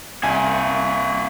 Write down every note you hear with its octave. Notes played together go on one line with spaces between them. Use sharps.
C2 A#3 E5 G#5